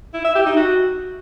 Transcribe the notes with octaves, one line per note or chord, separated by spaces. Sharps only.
E4
E5
G4
D#4
F#4